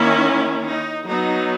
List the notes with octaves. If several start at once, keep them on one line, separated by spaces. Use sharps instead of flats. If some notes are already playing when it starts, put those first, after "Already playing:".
Already playing: D#3 A#3 C#4 E4
D#4
F#3 B3 D#4